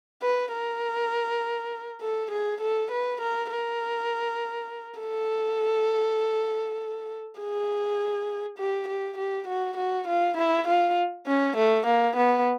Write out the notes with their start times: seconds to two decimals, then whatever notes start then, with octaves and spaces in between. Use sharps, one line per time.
0.23 B4
0.53 A#4
2.02 A4
2.31 G#4
2.61 A4
2.91 B4
3.21 A#4
3.51 A#4
5.00 A4
7.39 G#4
8.59 G4
8.88 G4
9.18 G4
9.48 F#4
9.77 F#4
10.08 F4
10.37 E4
10.68 F4
11.27 C#4
11.57 A3
11.87 A#3
12.16 B3